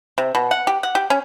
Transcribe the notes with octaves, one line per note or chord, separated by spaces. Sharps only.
C3
B2
F#5
G4
F#5
G4
C#4